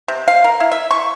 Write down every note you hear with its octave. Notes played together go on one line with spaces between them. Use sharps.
C3
F5
A#4
E4
E5
C#6